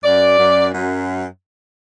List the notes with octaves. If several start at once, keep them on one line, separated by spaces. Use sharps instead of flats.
F#2 D5
F#2
F#2